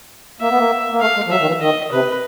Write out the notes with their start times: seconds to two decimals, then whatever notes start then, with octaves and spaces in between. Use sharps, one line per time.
0.41 A#3 E5
0.50 B3
0.58 A#3
0.92 A#3
1.01 A3 F5
1.16 G#3
1.26 F3
1.31 F#3 E5
1.40 D#3
1.47 E3
1.61 D#3 D#5
1.92 C3 B4